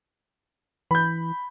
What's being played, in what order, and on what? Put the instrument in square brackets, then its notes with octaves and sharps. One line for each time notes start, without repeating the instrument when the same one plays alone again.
[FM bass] E3 [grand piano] B5 G6